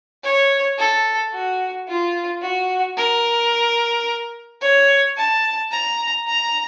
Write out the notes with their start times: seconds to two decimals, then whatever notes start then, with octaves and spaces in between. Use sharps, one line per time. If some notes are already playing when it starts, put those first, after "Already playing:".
0.23 C#5
0.78 A4
1.33 F#4
1.88 F4
2.42 F#4
2.97 A#4
4.61 C#5
5.17 A5
5.71 A#5
6.27 A#5